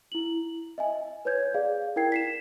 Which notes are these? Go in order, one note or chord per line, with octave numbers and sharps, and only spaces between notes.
E4 F#7
D#5 E5 G#5
B4 C#5 G6 G#6
G#4 D5 F5
E4 A#4 G5 G#6 C7
B6 C7 E7